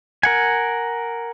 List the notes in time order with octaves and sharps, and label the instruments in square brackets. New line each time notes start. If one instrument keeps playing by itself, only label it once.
[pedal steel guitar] A#4 F#5 G#5